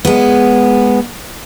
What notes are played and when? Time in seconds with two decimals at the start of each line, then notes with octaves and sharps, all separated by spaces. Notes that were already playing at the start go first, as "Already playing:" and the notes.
0.05 G#3 B3